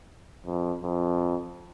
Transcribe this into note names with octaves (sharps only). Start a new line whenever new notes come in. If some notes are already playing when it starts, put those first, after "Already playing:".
F2
F2